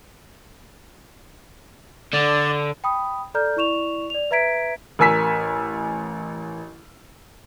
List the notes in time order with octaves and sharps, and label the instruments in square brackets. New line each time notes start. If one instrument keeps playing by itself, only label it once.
[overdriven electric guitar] D3 [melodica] D5
[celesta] G5 B5 D#6
A4 D5 A#5 F6 G6
E4 D5 C#6 E7 F7
D5 F7
B4 E5 A#5 G#6 B6 D7
[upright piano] A1 A#4 G#5 E6 B6